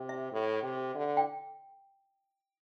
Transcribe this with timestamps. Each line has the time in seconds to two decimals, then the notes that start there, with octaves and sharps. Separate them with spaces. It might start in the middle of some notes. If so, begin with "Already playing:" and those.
Already playing: C3
0.09 E5
0.32 A2
0.63 C3
0.94 D3
1.17 G5